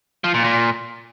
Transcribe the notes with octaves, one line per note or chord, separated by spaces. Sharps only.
F3
A#2
A#2